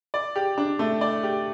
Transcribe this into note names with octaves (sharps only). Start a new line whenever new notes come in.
D5
G4
D4
A3
D5
G4